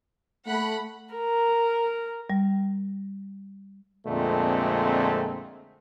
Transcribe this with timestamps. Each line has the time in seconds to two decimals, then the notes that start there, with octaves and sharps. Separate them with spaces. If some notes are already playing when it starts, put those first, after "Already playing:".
0.47 A3 F#5 B5
1.14 A#4
2.30 G3
4.07 F2 A#2 D3 G#3 A3 C4